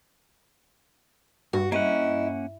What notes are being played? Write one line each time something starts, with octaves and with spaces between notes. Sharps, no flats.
G2 F#4
A#3 C#4 E4 D#5 F#5